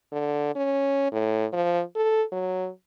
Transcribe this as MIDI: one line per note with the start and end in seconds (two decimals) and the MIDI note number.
0.12 0.53 50
0.55 1.10 61
1.11 1.46 45
1.53 1.82 53
1.95 2.23 69
2.32 2.68 54